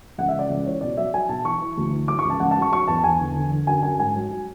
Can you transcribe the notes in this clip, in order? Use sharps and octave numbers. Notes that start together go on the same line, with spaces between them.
C#2 F#5
E5
C#3
D5
C#2
E3 C#5
B2 D5
F#3 E5
F#3 G#5
B2 A5
E3 C#6
E3
D2
E3
F#3 D6
C#6
C#2 A5
C#2 F#5
A5
F#3
C#6
F#3 C#6
E2 A5
E2 G#5
D3
D3
D3
F#2 G#5
F#2 G#5
G#2 G#5
F#3
F#3